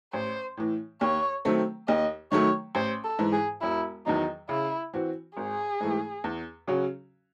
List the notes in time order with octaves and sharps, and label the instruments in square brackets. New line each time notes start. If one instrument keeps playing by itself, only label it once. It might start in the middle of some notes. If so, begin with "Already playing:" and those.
[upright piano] A1 [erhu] C5
[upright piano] A2 E3
[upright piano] D#2 [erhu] C#5
[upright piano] D#3 F#3 A3 C4
[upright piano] D#2 [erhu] D#5
[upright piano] D#3 F#3 A3 [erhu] C#5
[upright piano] A1 [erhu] C5
[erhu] A4
[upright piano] G#2 E3
[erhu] G#4
[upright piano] E1 [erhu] E4
[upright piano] E2 D#3 F#3 [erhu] D#4
[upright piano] C#3 [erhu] E4
[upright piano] E3 C4 F#4
[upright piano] G#1 [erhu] G#4
[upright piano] G#2 E3 A3
E2
C#3 F#3 C#4 F#4